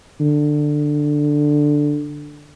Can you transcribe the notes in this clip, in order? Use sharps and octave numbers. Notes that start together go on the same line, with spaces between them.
D3